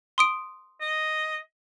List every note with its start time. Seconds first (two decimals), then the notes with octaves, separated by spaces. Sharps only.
0.18 C6 D#6 D7
0.81 D#5